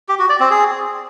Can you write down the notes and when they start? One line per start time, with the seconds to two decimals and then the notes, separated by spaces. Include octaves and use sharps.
0.08 G4
0.19 F#4
0.29 D5
0.40 C4
0.50 G#4